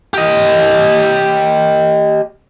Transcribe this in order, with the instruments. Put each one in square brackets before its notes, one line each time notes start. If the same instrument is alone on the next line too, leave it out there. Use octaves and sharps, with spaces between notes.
[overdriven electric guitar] G4 D#5